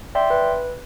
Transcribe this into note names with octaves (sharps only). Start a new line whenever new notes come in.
D5 E5 G5 C6
B4